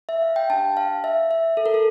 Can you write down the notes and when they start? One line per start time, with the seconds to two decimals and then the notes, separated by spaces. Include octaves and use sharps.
0.09 E5
0.22 F5
0.36 G5
0.50 D4 G4 A5
0.77 F5
1.04 E5
1.31 E5
1.57 A4
1.66 A#4
1.74 A4